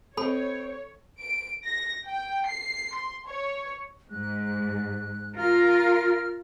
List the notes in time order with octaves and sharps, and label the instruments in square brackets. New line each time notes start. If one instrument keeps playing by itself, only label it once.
[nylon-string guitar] C4 B4 D#5 [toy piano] A4 B5 [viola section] C#5
[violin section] D7
A#6
G5
C7
C6
C#5
[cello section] G#2 [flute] F#6
[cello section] F4 A#4 [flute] F6